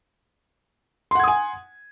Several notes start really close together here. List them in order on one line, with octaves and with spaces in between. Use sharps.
C6 F#5 G#6 D#6 G#5